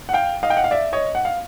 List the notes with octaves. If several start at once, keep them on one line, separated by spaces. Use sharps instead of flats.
F#5
F5 G5
D#5 F5
G5
F#5
F5
D5 E5
C#5 D#5
F#5
F5